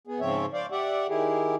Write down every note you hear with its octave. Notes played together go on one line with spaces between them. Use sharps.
B3 G#4
G#2 C#3 F3 C4 C#5 E5
C5 D5 F5
G4 D5 E5 F#5
D#3 E4 G4 G#4